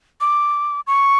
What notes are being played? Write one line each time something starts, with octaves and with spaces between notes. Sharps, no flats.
D6
C#6